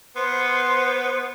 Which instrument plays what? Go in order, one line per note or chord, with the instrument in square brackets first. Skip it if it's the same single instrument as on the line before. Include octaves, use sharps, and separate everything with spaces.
[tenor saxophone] B3 [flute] C5 [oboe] C6